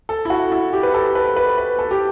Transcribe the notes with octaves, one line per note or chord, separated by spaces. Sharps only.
A4
E4
F#4
E4
G4
B4
A4
B4
B4
B4
A4
G4